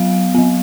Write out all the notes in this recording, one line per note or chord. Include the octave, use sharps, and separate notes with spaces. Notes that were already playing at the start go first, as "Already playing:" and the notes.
Already playing: F#3 B3 F5
F#3 B3